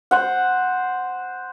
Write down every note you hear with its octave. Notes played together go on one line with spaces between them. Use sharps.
C5 F#5